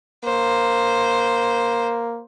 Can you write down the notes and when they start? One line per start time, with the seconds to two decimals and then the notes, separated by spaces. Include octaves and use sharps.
0.25 A#3 C5